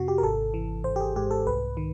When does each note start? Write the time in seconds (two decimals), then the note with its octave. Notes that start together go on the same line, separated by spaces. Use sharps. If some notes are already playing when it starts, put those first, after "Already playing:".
Already playing: F2 C3 F#4
0.08 G4
0.18 A#4
0.23 G#1 A4
0.54 E3
0.84 G#1 C5
0.96 G4
1.00 G#4
1.16 G#2 G4
1.31 A4
1.47 C2 B4
1.77 D#3